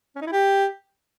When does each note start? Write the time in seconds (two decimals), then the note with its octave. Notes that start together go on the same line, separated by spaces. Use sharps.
0.16 C#4
0.21 D#4
0.27 E4
0.32 G4